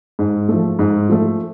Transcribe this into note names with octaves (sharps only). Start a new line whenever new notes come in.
G#2
A3
F3
G#2
F3 A3